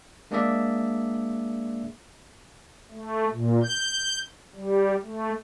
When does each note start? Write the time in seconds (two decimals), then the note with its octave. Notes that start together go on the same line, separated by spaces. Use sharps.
0.31 G#3 A#3 D4 G#4 D5 E5
2.92 A3
3.31 A#2
3.63 G6
4.55 G3
5.04 A3